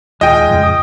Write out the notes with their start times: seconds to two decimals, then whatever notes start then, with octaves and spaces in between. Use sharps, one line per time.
0.21 D#1 D#2 D#3 G#3 F4 D#5 G5 G#5
0.49 F2 A2 C#3
0.63 D#6